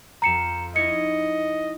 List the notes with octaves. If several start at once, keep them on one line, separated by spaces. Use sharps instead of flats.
F2 C4 A#5 C#7 E7
D#4 E4 C#5 D#5 C#7